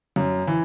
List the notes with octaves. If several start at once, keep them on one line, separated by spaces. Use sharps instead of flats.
F#2
E3